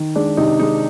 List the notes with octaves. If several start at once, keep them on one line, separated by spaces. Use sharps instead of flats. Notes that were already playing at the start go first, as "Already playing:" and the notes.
Already playing: D#3
G#3 D4
C3 D#4
G#3 D#4